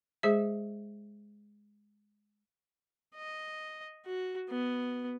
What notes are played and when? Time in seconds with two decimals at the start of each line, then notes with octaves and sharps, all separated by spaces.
0.23 G#3 G#4 C5 E5
3.15 D#5
4.06 F#4
4.49 B3